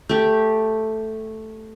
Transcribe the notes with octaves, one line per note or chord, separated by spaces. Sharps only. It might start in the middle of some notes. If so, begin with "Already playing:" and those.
A3 G4